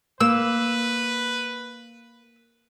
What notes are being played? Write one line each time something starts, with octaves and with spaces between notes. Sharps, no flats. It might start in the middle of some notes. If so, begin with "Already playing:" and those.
A#3 B4 E6